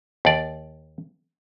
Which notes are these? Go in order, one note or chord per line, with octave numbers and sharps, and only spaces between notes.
D#2 D5